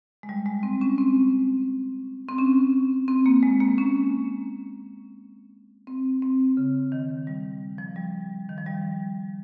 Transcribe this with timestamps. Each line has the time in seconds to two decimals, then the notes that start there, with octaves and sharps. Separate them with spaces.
0.23 G#3
0.29 G3
0.46 G#3
0.63 C4
0.81 C#4
0.98 C4
2.29 C4
2.38 C#4
3.08 C4
3.26 A#3
3.43 G#3
3.60 A#3
3.78 C#4
5.87 C4
6.22 C4
6.57 C#3
6.92 D#3
7.27 G3
7.78 F3
7.96 G3
8.49 D#3
8.58 F3
8.66 G3